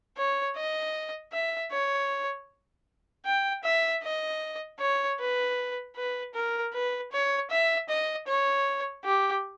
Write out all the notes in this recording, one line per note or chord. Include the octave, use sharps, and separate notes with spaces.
C#5
D#5
E5
C#5
G5
E5
D#5
C#5
B4
B4
A#4
B4
C#5
E5
D#5
C#5
G4